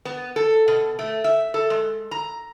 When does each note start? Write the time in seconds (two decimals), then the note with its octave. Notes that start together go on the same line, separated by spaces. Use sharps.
0.05 B3
0.36 A4
0.68 B2
0.99 A3
1.24 E5
1.54 A4
1.70 G#3
2.11 A#5